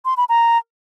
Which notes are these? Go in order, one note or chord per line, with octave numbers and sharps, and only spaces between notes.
C6
B5
A#5